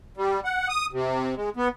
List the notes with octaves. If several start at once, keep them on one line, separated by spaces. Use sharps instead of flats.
G3
F#5
D#6
C3
G#3
B3